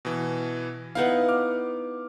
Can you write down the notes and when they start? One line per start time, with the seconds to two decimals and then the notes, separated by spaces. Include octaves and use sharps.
0.05 B2 E3
0.95 B3 D#4 E4 F5 F#5
1.28 D6 F6